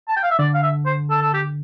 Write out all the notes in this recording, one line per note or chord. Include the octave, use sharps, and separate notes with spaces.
A5
G5
F5
E5
D3 D5
F5
E5
C5
A4
A4
G4